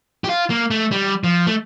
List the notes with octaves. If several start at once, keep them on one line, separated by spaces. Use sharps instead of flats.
G4
F4
A#3
A3
G3
F3
A3